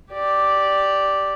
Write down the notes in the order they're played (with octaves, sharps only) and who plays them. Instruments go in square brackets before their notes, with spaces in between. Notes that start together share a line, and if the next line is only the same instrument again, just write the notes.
[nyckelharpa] G4 D5